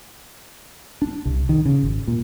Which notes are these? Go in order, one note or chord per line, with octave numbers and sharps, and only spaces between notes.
D4
C2
D#3
C#3
G#1
A#2